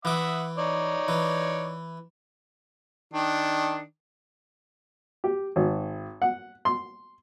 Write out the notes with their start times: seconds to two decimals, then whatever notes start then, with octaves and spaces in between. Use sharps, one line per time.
0.05 E3 E5 F#5 D6 D#6
0.58 D#4 C#5 D5
1.08 E3
3.14 D#3 D4
5.24 G4
5.56 G#1
6.22 F#5
6.65 C6